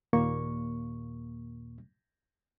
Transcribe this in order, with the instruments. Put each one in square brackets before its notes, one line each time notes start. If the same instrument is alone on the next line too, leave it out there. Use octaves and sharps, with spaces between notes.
[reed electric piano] D#2 A#2 A#3 C#6